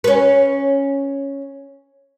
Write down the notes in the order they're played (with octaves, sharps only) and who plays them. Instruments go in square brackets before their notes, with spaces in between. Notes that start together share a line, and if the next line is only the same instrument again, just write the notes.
[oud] C#4 B4